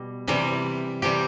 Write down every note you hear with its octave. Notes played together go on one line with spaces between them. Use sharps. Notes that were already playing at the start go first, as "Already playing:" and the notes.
Already playing: B2 G3
C3 E3 G3
C3 E3 G3 G4